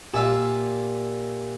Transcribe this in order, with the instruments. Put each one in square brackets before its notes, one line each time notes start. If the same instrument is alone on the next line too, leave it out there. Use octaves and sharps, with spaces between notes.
[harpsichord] A#2 E5 F5 [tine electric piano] G4 G#5